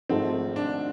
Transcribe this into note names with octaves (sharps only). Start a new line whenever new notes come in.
G#1 G#2 F3 A3 C4
D4